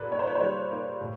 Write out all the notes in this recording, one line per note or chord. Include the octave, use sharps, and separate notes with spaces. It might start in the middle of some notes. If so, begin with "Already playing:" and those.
Already playing: A#2 G3 A#3 A4 B4
A#2 C#5
C5
B4 C#5
C5
G3 B4 C#5
A#3
A2